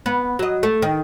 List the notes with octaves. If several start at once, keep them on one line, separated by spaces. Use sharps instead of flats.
B3
F#3 D#5
A3
D#3